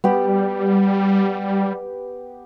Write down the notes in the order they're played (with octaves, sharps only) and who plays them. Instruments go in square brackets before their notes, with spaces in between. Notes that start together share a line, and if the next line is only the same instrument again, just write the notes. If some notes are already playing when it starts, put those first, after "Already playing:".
[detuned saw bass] G3 [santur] B3 G4